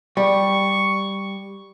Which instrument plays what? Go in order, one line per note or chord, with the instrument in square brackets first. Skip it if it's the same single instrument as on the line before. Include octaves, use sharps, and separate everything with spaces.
[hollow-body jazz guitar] G3 [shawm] C#6